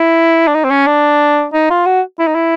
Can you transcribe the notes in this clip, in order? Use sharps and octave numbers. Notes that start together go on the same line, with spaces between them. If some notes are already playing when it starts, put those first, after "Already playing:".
Already playing: E4
D4
D#4
C4
C#4
D4
D#4
F4
F#4
E4
D#4
E4